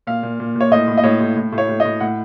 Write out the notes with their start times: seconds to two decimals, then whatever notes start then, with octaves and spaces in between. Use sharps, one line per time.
0.07 A#2 F5
0.23 A#2
0.40 A#2
0.55 A#2
0.61 C#5
0.71 A2 D#5
0.88 A2
0.98 D#5
1.03 A2 C#5
1.21 A2
1.37 A2
1.52 A2
1.58 C#5
1.69 A2
1.80 D#5
1.85 A2
2.00 A2 F#5